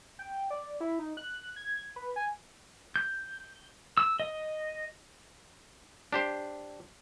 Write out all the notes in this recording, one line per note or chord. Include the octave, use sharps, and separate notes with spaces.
G5
D5
E4
D#4
F#6
G#6
B4
G#5
G6
E6
D#5
D4 G4 C5